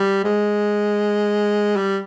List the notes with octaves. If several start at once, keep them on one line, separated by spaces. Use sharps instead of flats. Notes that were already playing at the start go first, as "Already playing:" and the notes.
Already playing: G3
G#3
G3